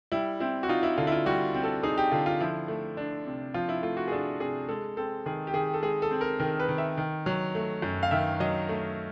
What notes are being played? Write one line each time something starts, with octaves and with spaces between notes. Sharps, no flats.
G3 E4
C4 E4
F#4
D#4 F4
E4
D3 F4
E4
F4
G3 F#4
C4
A4
D#4 G#4
G4
D3 F4
F4
F3 E4
A3
D4
C3
F3 F4
E4
A3 F4
F#4
G#4
D4 A4
C3 G#4
G#3 A4
C4 A4
D#3 G#4
G4
D#3 G#4
A4
G#3 G#4
A4
C4
A#4
D#3 A#4
B4
D#3
E5
D#3
F#3
A3
F#2
F5
D#3 E5
F#3 D#5
A3